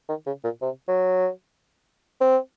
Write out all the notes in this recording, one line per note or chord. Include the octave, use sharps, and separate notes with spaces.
D#3
C#3
A#2
C3
F#3
C4